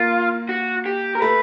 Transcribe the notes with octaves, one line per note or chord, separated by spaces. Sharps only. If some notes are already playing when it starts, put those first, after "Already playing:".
Already playing: A#3 F4
F#4
G4
A#4
A3 B4